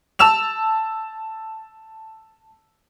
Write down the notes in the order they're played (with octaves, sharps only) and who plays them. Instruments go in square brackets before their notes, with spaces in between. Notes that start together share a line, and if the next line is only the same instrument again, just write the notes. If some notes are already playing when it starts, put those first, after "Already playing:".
[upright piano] A5 E6 E7 F7